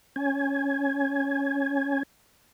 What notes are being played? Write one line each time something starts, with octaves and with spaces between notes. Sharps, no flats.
C#4 G#5